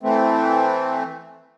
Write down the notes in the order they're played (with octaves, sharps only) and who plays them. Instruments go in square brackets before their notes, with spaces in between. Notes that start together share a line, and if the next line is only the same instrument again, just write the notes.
[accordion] E3 A3 C4